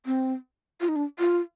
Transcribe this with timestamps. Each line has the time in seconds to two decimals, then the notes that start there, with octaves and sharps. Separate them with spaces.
0.06 C4
0.81 F4
0.89 D#4
0.96 D4
1.19 F4